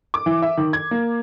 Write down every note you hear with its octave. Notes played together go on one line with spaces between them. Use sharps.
D6
E3
E5
D#3
G#6
A#3